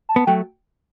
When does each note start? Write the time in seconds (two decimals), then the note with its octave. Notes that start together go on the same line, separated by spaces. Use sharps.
0.09 A5
0.16 B3
0.27 F#3 A3 G5